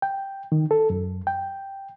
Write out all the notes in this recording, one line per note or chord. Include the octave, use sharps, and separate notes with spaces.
G5
D#3
A4
F#2
G5